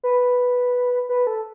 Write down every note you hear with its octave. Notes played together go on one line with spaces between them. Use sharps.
B4
B4
A4